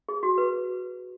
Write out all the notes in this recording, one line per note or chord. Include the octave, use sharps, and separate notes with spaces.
G#4
F#4
B4